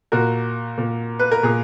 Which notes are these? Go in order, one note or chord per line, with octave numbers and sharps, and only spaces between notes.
A#2 F#4 A#4
A#2
B4
A#4
A#2 G#4